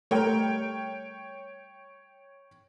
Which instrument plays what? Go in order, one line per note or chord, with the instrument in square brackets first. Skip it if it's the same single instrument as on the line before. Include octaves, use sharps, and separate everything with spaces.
[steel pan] G3 A3 A#4 [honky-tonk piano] C#5 G5